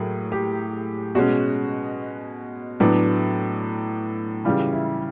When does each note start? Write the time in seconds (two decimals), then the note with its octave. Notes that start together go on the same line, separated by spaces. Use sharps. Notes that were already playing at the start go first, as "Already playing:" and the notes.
Already playing: A2 F#3 A#3 G#4
0.32 G4
1.15 B2 G#3 C#4 F#4
2.80 A2 F#3 B3 D4
4.45 C#3 E3 G3 F4
4.73 E4